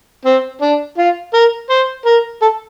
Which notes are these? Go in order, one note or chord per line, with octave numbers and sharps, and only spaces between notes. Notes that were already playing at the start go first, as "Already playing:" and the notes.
C4
D4
F4
A#4
C5
A#4
A4